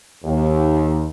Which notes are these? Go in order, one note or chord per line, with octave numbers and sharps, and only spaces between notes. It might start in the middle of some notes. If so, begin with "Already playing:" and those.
D#2